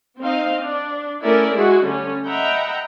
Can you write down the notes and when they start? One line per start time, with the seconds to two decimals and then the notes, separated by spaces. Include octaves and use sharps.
0.21 C4 D#4 D#5 F5
0.63 D4
1.23 A3 C#4 E4 A#4 D5 E5
1.56 G#3 E4 F#4 G#4
1.85 D3 G3 A3 C#4
2.27 D#5 E5 F#5 G5 A#5 B5